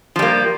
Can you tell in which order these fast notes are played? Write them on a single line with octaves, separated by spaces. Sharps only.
F3 G3 A#3